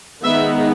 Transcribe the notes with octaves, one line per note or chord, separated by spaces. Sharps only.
D#3 G#3 B3 D#4 E5